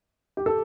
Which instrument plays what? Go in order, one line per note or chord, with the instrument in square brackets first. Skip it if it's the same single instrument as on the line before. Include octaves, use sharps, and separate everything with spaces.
[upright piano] G4
A4